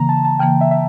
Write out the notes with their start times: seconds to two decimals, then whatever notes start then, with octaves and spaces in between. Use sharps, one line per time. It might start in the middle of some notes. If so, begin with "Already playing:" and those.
Already playing: C#3 E3 A#3 A#5
0.09 A5
0.25 A5
0.39 C#3 E3 A#3 G5
0.61 E5
0.71 E5